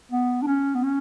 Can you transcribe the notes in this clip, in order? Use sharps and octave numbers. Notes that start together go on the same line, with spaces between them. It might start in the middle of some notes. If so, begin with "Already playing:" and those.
B3
D4
C#4
B3
C#4